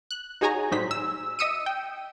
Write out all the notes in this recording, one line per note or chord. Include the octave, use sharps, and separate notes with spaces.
F#6
D#4 F#4 G#4 C#5 G#5 A#5
A2 F#3 G3 D#4 C5 B6
E6
D#5 E5 D#6 E6 C#7 D#7
G5